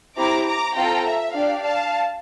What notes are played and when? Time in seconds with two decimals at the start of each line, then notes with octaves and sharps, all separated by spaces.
0.17 C4 E4 G4 A#5 D6
0.46 A#5 D6
0.75 C4 F4 A4 G5 A#5
1.05 E5
1.34 D4 G4 D5 F5
1.63 F5 A5